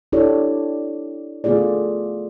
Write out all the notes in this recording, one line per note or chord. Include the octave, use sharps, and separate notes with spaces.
D4 E4 G4 A4 C#5 D5
D3 A3 B3 F4 G#4 D5